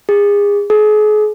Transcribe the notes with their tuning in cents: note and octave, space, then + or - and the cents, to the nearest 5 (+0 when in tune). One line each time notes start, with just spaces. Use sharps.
G#4 -30
G#4 +40